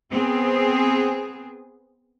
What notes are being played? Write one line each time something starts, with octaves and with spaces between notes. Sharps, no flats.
B3 C4 G#4